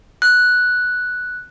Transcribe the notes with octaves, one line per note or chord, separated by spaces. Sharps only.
F#6